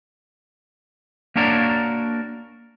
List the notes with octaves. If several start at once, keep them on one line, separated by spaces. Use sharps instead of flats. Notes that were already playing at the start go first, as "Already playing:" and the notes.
A#3 D4 F#4 A#4 C#5 D5